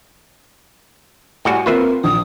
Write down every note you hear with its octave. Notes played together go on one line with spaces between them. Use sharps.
A2 G3 F#4 G#5
A#3 C4 F4 A#4 B4 E5
A#1 D#6